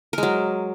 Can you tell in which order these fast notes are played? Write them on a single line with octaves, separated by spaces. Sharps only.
A#4 G#3 F#3